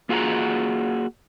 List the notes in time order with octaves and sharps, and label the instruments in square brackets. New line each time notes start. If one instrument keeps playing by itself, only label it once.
[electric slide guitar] A#3 F4 F#4 G#4 F#5 A#5